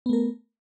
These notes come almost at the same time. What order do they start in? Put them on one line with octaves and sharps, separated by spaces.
B3 A3 A#4